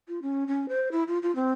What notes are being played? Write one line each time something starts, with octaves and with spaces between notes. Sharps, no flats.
F4
C#4
C#4
C5
E4
F4
F4
C4